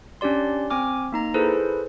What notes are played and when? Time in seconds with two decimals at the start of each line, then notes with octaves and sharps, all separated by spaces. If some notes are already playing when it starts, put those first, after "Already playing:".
0.21 C#4 D4 G4 D5 C6
0.70 C4 G#5 D6 F6
1.12 A#3 D#4 A#5
1.34 E4 G#4 A4 B4 C5